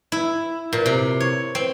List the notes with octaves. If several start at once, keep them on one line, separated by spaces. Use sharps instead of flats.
E4
A#2
C3
C#5
C4